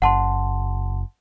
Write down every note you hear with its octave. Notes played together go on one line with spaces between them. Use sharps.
F#1 F#5 A5 C6